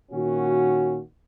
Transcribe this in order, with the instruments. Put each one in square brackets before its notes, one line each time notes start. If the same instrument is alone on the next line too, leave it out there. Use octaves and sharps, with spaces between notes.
[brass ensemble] A#2 D#3 A#3 C#4 F#4